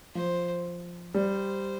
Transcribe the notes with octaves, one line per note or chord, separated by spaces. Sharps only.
F3 C5
G3 C5